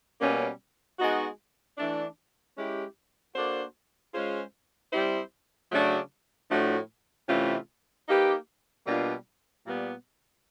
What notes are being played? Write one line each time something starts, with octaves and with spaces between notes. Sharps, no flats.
B2 G3 A#3 C#4
G#3 B3 D#4 F#4
E3 A3 D4
G#3 C#4 E4 G4
A#3 D4 F#4 A4 C5
G#3 C#4 F4 G#4 C5
G3 C4 E4 G4 C5
C#3 F#3 A3 D4 F#4
A2 F3 A3 D4 F#4
C3 E3 A3 C#4 F4
A#3 D#4 G4 B4
B2 G3 A#3 D4 F4
A#2 G3 B3